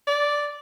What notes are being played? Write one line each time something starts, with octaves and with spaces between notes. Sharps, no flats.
D5